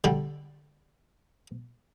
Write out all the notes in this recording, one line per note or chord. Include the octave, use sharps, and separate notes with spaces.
D3 G3